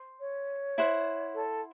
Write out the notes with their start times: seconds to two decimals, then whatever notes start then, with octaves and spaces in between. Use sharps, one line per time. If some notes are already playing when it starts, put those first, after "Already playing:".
Already playing: C5
0.20 C#5
0.78 E4 C5 F#5
1.35 A4